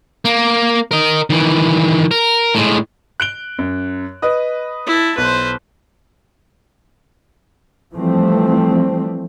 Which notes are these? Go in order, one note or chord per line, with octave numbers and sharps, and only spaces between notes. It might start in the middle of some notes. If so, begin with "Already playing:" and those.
A#3
A#4 D#5
D#3 E3
A#4
A2 G#3
F#6 D7 G7
F#2
B4 D#5 D#6
E4 A5
B1 B4 C5
E3 F3 G3 A3 C4